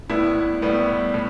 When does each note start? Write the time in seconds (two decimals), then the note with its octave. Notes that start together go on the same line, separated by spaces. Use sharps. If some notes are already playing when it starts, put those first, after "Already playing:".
0.09 A2 G3 B3 E4
0.62 A2 G3 B3
1.14 A2